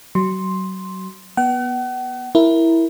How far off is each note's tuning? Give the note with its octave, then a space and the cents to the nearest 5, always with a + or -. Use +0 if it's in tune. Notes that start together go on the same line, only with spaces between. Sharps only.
F#3 +30 C6 +5
B3 -15 F#5 +40
E4 +0 A#4 +0